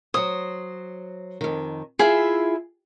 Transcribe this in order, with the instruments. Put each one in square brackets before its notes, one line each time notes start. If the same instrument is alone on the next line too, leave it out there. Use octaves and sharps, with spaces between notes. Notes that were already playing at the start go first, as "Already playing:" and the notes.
[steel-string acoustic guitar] F#3 C5 [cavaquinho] D#6
[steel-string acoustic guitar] F2 D#3
[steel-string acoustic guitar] E4 F4 E5 [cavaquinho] G#4